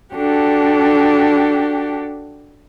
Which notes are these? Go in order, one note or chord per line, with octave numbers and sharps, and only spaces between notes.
D4 F#4 G4 A4